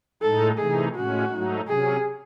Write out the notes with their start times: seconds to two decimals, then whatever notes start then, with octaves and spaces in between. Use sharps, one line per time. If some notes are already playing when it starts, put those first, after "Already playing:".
0.22 A2 G#3 D#4 A4
0.58 C3 E3 A3 D#4 G#4
0.95 A2 G#3 C#4 F#4
1.32 G#2 F#3 A3 D#4
1.68 C3 F#3 C#4 G#4